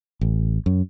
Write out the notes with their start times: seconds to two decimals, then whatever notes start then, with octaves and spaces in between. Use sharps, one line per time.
0.21 A1
0.66 F#2